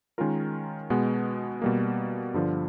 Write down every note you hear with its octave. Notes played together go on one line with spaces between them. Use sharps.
D#3 G#3 C#4 F4 A#4
B2 G#3 B3
B2 G3 A#3
G2 D3 F3